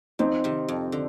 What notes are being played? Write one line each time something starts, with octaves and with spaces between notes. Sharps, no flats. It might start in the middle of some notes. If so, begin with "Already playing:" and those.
F2 C4 D#4
C3 D#3
F2
D3